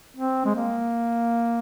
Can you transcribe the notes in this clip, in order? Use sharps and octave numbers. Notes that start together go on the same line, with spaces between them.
C4
G#3
A#3